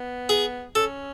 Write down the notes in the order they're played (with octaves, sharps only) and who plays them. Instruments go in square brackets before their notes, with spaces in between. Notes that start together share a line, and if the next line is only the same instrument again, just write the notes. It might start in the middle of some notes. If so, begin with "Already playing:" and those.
Already playing: [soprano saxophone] B3
[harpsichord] G#4
[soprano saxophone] C#4 [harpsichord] A4